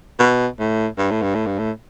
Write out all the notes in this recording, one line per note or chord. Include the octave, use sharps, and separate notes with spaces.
B2
A2
G2
A2
G2
A2
G2
A2